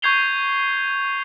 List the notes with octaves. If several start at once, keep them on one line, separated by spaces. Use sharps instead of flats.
C#6 G6 G#6 C7 F7 G7